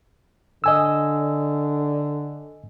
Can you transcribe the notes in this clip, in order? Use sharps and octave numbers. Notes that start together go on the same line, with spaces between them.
D3 D#5 G#5 E6